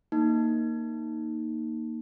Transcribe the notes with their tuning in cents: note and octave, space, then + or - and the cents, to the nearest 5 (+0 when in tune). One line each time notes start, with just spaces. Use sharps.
A#3 +0 D#4 +0